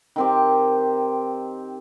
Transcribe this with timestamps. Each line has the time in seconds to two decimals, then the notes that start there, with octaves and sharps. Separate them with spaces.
0.16 D#3 C4 G4